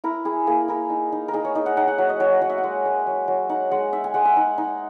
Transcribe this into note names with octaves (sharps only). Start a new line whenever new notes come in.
E4 A#4
E4 G#4
A#3 G#4
E4 A#4
D#4
D#4
A#4
D#4 G#4
C#5
D#4 D#5
F#5
D#4 F#5
F#5
F#3 E5
D#5
F#3 C#5
F#3 F#5
E5
F#5
G#3
G#3
F#3
F#3
D#4 F#5
G#3 F#5
D#4 E5
G#5
G#3 F#5
E5
D#4
D#4